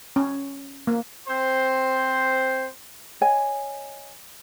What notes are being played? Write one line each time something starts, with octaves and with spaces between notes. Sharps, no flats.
C#4
A#3
C4 C5
C#5 D#5 G#5